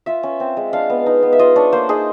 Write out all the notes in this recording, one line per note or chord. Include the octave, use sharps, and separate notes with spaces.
F4 E5
C#4
C4
G#3
D4 F5
B3
D#4
B3
E5
F4 D#5
D4 C#5
A#3 C5
D#4 G#4